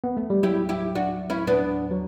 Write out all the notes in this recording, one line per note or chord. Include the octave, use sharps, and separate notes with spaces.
B3
A3
G3
F#3 E4 G4
E4 G4
D4 F#4
C#4 E4
B3 D4
F#3